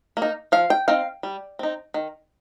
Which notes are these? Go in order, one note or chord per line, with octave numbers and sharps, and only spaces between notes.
A#3
D#4
F3 F5
G5
C4 D#4 F5
G3
C4 D#4
D#3